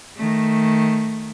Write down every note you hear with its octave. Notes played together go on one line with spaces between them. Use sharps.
D#3 A3